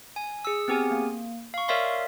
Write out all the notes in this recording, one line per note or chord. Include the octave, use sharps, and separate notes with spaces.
G#5
G#4 E6
B3 C4 G4 G#4 G#5
A#3
F5 C#6
A#4 C#5 D5 E5 F5 C6